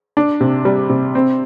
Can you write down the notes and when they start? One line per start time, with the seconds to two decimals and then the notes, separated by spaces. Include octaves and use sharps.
0.17 D4
0.41 C3
0.65 G3
0.90 C3
1.15 C4